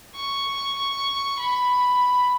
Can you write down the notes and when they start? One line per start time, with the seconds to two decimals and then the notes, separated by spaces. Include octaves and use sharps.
0.16 C#6
1.39 B5